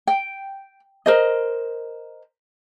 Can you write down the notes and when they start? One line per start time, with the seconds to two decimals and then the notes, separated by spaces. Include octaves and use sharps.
0.07 G5
1.06 A#4 C5 D#5